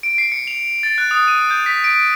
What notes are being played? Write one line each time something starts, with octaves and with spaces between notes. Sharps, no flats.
D7
C7
C#7
F7
A6
F#6
D#6
D#7
G6
B6
D7